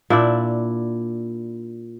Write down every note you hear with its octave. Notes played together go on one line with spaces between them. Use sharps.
A#2 D4 E4 D5